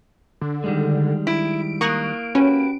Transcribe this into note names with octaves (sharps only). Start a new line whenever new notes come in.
D3
D#3 G3 G#3
E4 D7
A#3 C#6 D#6 F#6
C#4 F#4 G4 B4